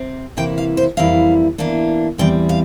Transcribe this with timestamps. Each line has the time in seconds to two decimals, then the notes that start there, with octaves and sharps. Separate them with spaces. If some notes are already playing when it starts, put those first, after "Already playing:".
Already playing: C3 C4
0.37 C3 E3 A#3 E4 G5
0.58 F5
0.77 C5
0.97 F2 E3 G3 A#3 E4 F5
1.58 E2 E3 A#3 D4
2.18 E2 E3 G3 C4 G5
2.49 F5